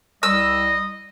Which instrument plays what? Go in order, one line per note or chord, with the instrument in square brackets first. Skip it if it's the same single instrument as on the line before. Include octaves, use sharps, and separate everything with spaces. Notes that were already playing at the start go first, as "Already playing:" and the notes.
[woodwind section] C2 G3 [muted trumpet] D#5 [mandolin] E6